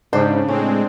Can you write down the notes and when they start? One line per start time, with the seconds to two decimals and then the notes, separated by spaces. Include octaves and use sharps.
0.13 G#2 C#3 D4 G4 C5
0.48 A2 G#3 C4 C#4